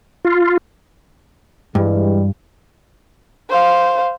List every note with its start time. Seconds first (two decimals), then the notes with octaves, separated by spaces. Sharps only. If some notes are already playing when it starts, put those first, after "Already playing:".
0.25 F4
1.75 G2 E3 G3 G#3
3.50 C5 F5